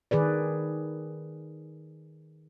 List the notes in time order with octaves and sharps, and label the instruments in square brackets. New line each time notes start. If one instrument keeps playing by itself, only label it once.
[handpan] D#3 G#4 B4 D5